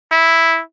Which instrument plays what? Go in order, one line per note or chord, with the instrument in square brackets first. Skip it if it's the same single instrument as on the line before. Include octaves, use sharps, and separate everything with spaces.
[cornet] E4